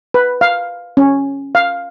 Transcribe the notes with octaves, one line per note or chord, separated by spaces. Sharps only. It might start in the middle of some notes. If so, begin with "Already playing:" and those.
B4
F5
C#4
F5